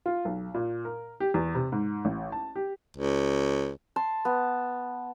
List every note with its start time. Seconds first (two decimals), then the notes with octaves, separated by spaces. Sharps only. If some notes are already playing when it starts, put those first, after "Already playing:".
0.06 F4
0.25 B1
0.54 A#2
0.85 A#4
1.20 G4
1.34 E2
1.55 C3
1.72 G#2
2.05 A1
2.32 A5
2.56 G4
2.97 C#2
3.96 A5 C6
4.25 B3